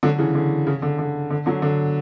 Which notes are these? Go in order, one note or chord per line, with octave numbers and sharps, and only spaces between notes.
D3 F#3
C#3 E3
D3
C#3
D3
D3
D3
D3 F#3
D3